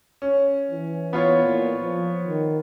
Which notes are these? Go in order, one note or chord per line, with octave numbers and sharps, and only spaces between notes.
C#4
E3
B3 F4 C#5
A#2
F3
D#3